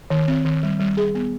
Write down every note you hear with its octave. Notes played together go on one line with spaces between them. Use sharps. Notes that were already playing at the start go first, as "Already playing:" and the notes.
D#3
C4
D#3
G3
G3
G#4
B3